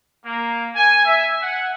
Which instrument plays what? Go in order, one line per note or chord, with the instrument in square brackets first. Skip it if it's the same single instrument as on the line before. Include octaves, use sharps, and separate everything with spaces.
[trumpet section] A#3
G#5
E5
F#5